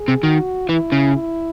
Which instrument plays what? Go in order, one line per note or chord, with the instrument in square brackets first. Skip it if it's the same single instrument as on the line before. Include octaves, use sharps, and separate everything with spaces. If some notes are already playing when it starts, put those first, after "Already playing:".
Already playing: [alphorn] G#4
[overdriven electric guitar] C3
[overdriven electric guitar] D#3 [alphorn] F#4
[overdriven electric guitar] E3 [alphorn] E4
[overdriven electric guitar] C#3
[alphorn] E4